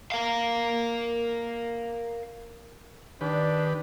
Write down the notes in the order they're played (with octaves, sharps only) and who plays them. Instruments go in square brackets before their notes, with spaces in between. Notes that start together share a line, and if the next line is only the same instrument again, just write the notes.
[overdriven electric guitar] A#4 F5
[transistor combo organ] D#3 G4 B4 [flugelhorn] D4